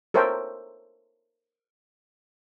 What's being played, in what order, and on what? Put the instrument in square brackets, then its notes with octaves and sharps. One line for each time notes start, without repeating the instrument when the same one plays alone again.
[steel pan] A4 A#4 C5 C#5 E5 G5